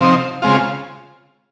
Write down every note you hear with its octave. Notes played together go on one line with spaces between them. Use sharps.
C3 F3 C4 D#4
C#3 G#3 C4 F4